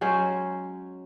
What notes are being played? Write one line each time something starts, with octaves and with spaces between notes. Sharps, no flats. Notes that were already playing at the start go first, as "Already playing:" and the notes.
F#3 G#3 C#4 C5